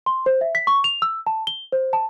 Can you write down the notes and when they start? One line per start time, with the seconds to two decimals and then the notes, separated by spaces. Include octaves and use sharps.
0.06 C6
0.26 C5
0.41 E5
0.55 B6
0.67 C#6
0.84 F7
1.02 E6
1.27 A5
1.47 G7
1.72 C5
1.93 A5